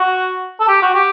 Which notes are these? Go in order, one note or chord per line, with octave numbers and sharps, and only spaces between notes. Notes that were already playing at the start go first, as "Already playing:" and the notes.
Already playing: F#4
A4
G4
F#4
G4